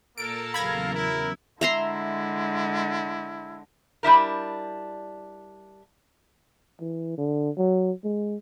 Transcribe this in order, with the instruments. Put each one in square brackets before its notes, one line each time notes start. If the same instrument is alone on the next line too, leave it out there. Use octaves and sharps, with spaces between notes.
[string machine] A#2 E6 A6 [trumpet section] A#3 A4 A#4 [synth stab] D7
[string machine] E2 C#3 F#3 [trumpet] F5 [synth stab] B5 G#6 A#6
[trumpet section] E4 [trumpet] A#4
[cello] D3 G#3 [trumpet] E4 [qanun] E5 A#5 C6
[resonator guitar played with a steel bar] G3 D4 E4 A#4
[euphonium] E3
D3
F#3
G#3